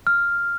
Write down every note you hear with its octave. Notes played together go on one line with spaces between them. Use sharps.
F6